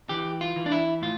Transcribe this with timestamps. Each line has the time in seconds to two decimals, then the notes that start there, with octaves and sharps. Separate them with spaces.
0.09 E3 G4
0.41 F4
0.56 E3
0.66 D4
0.72 E4
1.02 A2 F4